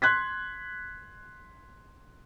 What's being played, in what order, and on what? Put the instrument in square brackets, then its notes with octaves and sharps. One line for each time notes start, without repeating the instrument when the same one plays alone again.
[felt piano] C6 F#6 G#6 B6